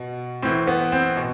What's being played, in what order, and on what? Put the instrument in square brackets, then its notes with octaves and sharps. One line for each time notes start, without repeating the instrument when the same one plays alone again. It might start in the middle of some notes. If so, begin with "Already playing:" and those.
Already playing: [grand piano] B2
A2 E3 C4
B3
C4
B2